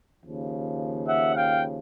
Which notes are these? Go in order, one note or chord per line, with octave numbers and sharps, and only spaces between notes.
D#2 C#3 F3
E5 F#5
F5 G5